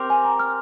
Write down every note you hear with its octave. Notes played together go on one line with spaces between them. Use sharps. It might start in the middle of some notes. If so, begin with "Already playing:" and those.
Already playing: C4 G4 A#4 C6
G#5
A#5
F6